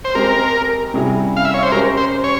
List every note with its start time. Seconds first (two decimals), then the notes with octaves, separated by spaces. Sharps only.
0.05 C5
0.15 G#3 C4 G4 A#4
0.94 C3 G3 C#4 E4 G#4
1.37 F5
1.45 E5
1.54 C#5
1.63 C5
1.72 G#3 C#4 G4 A#4
1.97 C5
2.24 C#5